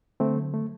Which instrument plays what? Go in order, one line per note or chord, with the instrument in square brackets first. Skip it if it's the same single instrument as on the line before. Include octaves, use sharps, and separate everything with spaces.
[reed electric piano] D3 A3 C4
F#3
A3